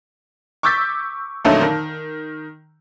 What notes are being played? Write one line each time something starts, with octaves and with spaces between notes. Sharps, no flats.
C#6 D6 E6 G6 A6 B6
F2 A#2 D3 F#3 A3 D#4
D#3